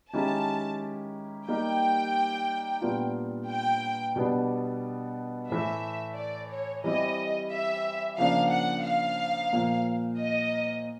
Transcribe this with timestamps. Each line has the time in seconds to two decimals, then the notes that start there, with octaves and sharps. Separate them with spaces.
0.13 D#3 G#3 C#4 E4 G4 A5
1.48 G3 A#3 D#4 G4 G5
2.81 A#2 G3 B3 D4 F4
3.49 G5
4.16 B2 G3 B3 D4
5.49 A2 E3 A3 E5
6.17 D5
6.51 C#5
6.84 E3 G3 C4 E4 G4 D#5
7.52 E5
8.18 C#3 F3 A#3 D4 F5
8.51 F#5
8.85 F5
9.53 A#2 F3 A#3
10.19 D#5